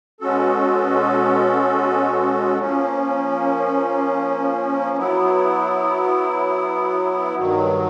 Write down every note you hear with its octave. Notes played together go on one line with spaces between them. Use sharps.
B2 G#3 C#4 F#4 A4
F3 A#3 C#4
F#3 B3 E4
G2 D#3 F#3